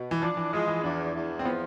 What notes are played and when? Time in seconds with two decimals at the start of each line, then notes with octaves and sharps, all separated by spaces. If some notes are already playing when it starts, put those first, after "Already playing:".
Already playing: B2
0.11 E3
0.22 F3 D4
0.37 E3
0.53 F3 G#3
0.68 E3
0.83 E2 D4
1.14 E2
1.39 C4
1.45 F3 B3